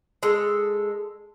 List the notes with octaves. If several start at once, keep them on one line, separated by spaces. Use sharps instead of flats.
G#3 A4